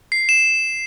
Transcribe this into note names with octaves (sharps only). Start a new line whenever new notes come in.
C7
E7